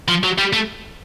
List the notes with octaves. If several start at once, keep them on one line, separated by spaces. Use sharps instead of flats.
F3
F#3
G3
A3